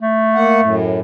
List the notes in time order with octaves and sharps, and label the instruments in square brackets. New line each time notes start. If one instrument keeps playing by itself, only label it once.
[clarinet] A3
[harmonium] A#3 F#5
F#2 A2